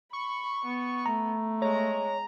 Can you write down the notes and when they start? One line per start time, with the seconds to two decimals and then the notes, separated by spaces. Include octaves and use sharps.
0.13 B5 C#6
0.65 B3
1.06 A3 A#5
1.62 G#3 C#5 A#5